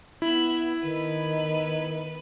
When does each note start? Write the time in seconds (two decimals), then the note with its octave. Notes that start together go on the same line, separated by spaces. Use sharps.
0.22 B3 E4 E5 F#6
0.82 D#3 B3 B4